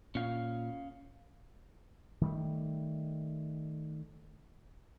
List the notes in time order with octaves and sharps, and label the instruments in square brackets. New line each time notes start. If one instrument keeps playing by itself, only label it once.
[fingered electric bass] A#2 [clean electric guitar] C#4 F5
[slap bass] D#3 G3 A3